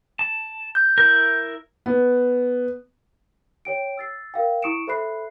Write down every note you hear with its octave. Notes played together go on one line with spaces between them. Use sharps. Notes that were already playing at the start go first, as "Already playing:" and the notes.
A5
G6
E4 A#4 G6
B3
C#5 G5 D7
E6 A6 C7
A#4 F5 G5
E4 C#6 D#6 C#7 D7 E7
A4 C5 E5 B5 F#6 C7